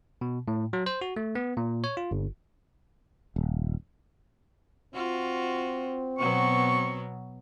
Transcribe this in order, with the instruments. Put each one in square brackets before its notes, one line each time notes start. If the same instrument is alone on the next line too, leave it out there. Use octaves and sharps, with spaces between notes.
[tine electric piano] B2
A2
F#3
C5
F#4
A3
B3
A#2
C#5
F4
G1
[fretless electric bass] D#1
[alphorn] C4 [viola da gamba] F4 F#4
[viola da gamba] B2 F#3 B3 [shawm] C#6